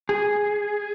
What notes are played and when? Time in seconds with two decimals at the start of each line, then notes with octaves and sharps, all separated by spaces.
0.09 G#4